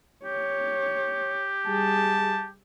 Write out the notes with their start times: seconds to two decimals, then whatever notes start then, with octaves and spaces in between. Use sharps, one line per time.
0.25 G4 C#5
1.67 G3 G#4 A5